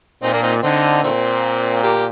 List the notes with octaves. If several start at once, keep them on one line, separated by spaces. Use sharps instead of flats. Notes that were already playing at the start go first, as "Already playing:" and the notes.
A#2 C4 D#4
A#3 D4
C4 D#4
D3 C4 D#4
A#2 D#3 A3 C4
G4 A#4